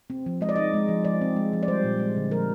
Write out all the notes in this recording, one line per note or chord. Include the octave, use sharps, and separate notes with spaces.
C4
F3
G#3 D#5
D5
D#4 D#5
G#3
F3
F3 D5
C4
G#3
F3
D5
G3 C5
A#2
G#3
D3
F3 A#4